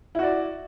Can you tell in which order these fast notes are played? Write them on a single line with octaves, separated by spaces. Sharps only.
E4 F#4 D5